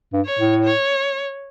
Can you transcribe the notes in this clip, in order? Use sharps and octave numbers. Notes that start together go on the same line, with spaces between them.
G2
C#5
A2
C#5